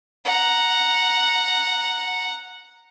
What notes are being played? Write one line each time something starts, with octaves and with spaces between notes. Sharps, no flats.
F#5 A#5